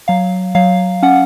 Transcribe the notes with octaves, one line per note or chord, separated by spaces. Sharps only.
F#3 F5
F#3 F5
C#4 F#5